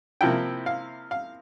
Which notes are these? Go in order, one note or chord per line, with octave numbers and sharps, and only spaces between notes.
C3 F3 A#3 E4 G5
F5
F5